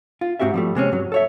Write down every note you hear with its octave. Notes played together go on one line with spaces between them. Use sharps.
F4
G#2 C4 F#4 G4 E5
F3 G3 A3
C3 G#3 C4 C#4
G2 F#3
A4 C#5 E5